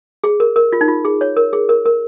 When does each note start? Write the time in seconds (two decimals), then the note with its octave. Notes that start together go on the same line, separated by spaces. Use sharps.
0.24 G#4
0.40 A#4
0.56 A#4
0.73 F4
0.81 D#4
0.88 F4
1.05 G#4
1.21 C#5
1.37 A#4
1.53 G#4
1.69 A#4
1.85 A#4